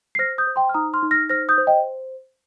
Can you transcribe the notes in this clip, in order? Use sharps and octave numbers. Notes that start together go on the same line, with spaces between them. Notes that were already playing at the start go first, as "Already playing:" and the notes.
C7
C5 F6 A#6
D#6 G6
C5
G5 C6
F6
D#4 A#5 D#6
C6 F6
D#4
F6 A#6
C5 F6 A#6
D#6 G6
C5
D#5 G5